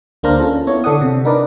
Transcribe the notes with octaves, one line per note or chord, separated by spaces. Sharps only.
D2 A#3 D4 C5 A#5 F6
C#4 F4 A4
B3 E4 C#5
D3 A4 D5 F#5 D#6
C3
D4 D#4 A#4 B4 D5